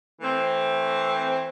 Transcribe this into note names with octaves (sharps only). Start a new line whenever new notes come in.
E3 A3 C4